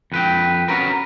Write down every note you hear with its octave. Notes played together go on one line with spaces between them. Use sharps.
F2 B4 G5
C#4 F#4 A#4 B4